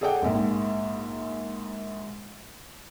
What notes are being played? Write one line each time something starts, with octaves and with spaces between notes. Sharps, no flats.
G#4 A4 D5 F#5 G5
A#1 G#2 A#3